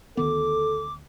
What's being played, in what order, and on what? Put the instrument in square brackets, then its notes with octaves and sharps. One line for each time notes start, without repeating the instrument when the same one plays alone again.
[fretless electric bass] D2 D#3 B3 [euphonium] A4 [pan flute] D6